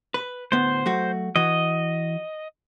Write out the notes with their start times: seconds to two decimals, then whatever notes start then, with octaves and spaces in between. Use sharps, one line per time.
0.14 B4
0.52 D2 A2 B3 C5
0.86 F#3 A3 F#4
1.36 E3 F#4 D#5